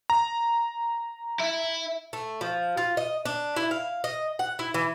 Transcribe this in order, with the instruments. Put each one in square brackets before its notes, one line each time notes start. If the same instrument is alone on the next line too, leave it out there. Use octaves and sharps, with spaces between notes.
[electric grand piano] A#5
[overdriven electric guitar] E4 E5
[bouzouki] A3
F3
F4
D#5
D4
E4
F5
D#5
F#5
E4
E3